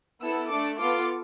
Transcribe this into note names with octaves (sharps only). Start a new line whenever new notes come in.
B3 E4 A4 E6
A3 D4 A4 D6
B3 F4 A4 D6